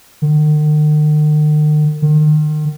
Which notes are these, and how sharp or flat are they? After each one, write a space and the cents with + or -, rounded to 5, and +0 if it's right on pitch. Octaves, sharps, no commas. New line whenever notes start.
D#3 -45
D#3 -35